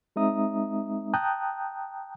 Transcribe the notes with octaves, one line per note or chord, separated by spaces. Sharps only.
G#3 C4 D#4 E5 A#5 D#6
G5 A5 A#5 D#6 F#6 G6